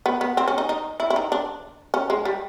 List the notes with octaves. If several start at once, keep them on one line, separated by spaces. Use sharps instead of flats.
B3
B3
C4
C#4
D#4
D#4
E4
E4
D#4
D4
C#4
G#3
G3